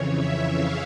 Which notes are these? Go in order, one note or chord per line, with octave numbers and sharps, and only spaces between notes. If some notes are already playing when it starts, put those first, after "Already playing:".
Already playing: F2 C#3 E3 C#5
E5
F5